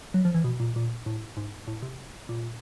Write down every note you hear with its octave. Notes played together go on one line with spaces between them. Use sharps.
F#3
F3
E3
B2
A#2
A#2
A2
G#2
A2
C3
A#2